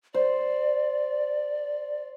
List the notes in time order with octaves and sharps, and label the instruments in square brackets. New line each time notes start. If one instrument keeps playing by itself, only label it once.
[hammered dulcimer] C5 [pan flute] D5